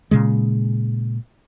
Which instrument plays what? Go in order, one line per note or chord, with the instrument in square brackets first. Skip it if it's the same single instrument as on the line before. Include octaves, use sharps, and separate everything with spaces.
[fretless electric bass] A#2 C#3 G#3